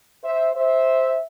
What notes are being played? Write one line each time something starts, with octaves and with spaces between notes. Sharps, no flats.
C5 E5
C5 E5